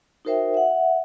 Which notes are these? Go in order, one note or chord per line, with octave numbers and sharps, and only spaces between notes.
D#4 F#4 A#4 C5 E5 G5
E5 F#5